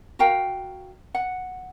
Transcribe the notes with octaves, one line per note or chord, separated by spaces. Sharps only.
F#4 A#4 F5 G5
F#5